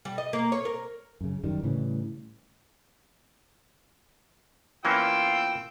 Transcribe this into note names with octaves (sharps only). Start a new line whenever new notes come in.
G3
D#5
A#3
C#5
A#4
F#2 C#3
F#2 D#3 G3
A2 C#3 E3 G3
E3 A#3 C#4 F4 G5 E6